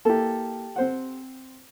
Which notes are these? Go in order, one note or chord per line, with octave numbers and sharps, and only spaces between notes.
A#3 E4 G4 A4
C4 C5 F#5